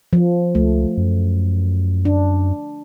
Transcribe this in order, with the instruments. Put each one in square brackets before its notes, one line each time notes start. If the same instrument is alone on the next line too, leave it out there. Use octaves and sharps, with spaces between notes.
[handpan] F3
[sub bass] C#2 [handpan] A3
[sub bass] F#2
[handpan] D4